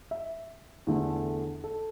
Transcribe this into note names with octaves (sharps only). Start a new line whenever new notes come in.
E5
E2 D3 A3
A4